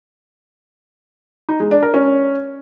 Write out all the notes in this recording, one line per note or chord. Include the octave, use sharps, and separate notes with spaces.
D#4
G#3
D4
A#4
C#4